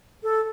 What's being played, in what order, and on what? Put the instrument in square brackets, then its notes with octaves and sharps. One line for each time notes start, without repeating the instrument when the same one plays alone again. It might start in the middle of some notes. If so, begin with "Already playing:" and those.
[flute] A4